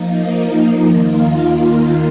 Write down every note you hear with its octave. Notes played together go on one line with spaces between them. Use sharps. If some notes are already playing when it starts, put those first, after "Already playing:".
Already playing: F3 A#3 D#4
D#2 D#3 A#3 F4